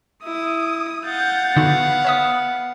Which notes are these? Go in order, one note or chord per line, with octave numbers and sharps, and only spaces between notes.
E4 D#6
F5 F#5 G6 A6
D3 B3 D#4 F#4
C#5 E5 D#6